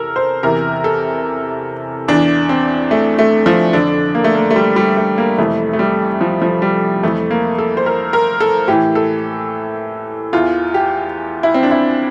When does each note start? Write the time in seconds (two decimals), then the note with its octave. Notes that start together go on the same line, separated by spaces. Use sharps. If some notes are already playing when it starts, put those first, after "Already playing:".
Already playing: E2 C3 A4 A#4
0.16 C5
0.43 E2 C3 E3 A#4
0.84 A4
2.08 E2 E3 D4
2.49 C4
2.91 A3
3.19 A3
3.46 F3
3.73 F2 D3 D4
4.15 A#3
4.24 A3
4.35 A#3
4.51 A3
4.56 G3
4.76 G3
4.97 A3
5.18 A#3
5.38 F2 C3 E3 A3
5.73 A3
5.79 G3
6.21 F3
6.42 F3
6.62 G3
7.03 F2 E3 A3
7.31 A#3
7.58 A4
7.77 C5
7.86 A#4
8.13 A#4
8.40 A4
8.68 A2 E3 G4
8.95 A4
10.33 E2 E3 F4
10.74 G4
11.43 E4
11.54 C4
11.63 D4
11.71 E4